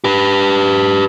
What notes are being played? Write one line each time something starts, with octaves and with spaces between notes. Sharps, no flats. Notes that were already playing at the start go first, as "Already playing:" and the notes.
G4 B4